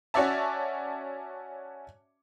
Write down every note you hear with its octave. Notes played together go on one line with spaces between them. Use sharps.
C#4 F#4 C#5 D5 E5 A5